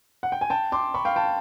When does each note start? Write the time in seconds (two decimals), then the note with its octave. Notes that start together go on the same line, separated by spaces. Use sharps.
0.23 F#5
0.32 G5
0.41 G#5
0.50 G5 A5
0.72 C6 D6
0.94 B5 C#6
1.05 F5 G5
1.16 G5 A5